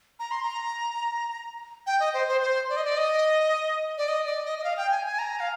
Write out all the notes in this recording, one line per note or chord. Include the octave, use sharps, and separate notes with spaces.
A#5
C6
A#5
G5
D#5
C5
C5
C5
D5
D#5
D5
D#5
D5
D#5
D5
D#5
D#5
F5
G5
G#5
G#5
A#5
F5